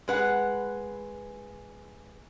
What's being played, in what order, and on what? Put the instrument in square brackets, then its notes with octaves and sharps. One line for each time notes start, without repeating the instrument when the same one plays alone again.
[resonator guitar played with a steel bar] G#3 B4 F#5